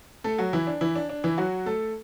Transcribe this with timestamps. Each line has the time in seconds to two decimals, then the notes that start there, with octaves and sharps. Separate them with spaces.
0.24 A3 A4
0.39 F#3 F#4
0.53 E3 E4
0.67 D4
0.81 E3 E4
0.96 D4
1.09 D4
1.24 E3 E4
1.38 F#3 F#4
1.66 A3 A4